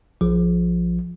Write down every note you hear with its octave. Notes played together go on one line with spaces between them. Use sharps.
A#1 F3